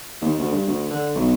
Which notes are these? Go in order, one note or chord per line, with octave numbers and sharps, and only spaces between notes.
D#2
D2
G2
D2
D3
B1